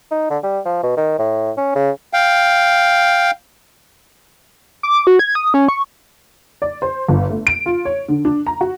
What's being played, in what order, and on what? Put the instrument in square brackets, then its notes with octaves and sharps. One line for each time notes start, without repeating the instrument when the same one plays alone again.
[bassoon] D#4
D3
G3
F3
B2
D#3
A2
C#4
C#3
[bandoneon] F5 G5
[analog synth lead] D6
F#4
G#6
D#6
C#4
C#6
[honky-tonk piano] D5
C5
G1
A3
D7
F4
C#5
D3
D4
A#5
F#4